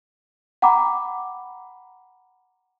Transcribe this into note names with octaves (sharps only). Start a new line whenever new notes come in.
F#5 G5 A#5 B5 D6